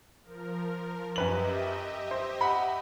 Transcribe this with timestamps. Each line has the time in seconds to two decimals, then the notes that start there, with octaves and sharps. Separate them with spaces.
0.23 F3 A#4
1.16 F#2 G4 B4 D#5 E5 F#7
2.11 C5
2.41 F#5 B5